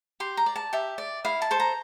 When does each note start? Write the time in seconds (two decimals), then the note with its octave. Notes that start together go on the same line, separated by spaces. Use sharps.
0.20 G4 C6
0.37 A#5
0.46 D5
0.56 A5
0.73 G4 E5
0.98 D5
1.25 E4 F5
1.42 A5
1.51 A4 C5
1.60 A#5